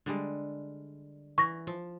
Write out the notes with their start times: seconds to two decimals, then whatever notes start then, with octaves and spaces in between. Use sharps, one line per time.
0.06 D3 G3 G#3
1.38 E3 C#6 A#6
1.67 F3